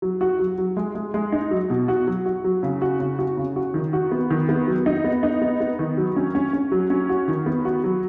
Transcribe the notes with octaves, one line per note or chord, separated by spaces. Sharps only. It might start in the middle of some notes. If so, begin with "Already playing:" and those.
F#3
F#4
F#3
F#3
G#3
G#3
G#3
D#4
F#3
B2
F#4
F#3
F#4
F#3
C#3
F#4
C#3
F#4
C#3
F#4
D#3
F#4
B3
D#3
B3
F#3
D#4
B3
D#4
B3
B3
D#3
F#3
C#4
C#4
C#4
F#3
C#4
F#4
D#3
B3
F#4
F#3